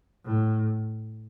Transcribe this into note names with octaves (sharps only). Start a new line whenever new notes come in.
A2